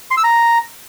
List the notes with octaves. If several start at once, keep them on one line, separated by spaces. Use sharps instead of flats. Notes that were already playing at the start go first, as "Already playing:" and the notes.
C6
E6
A#5